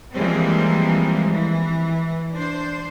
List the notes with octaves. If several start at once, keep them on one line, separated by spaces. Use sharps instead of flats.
E3 F3 G3 G#3 A#3 C4
E3
D4 C5